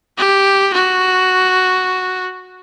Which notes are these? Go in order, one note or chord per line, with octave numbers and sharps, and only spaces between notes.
G4
F#4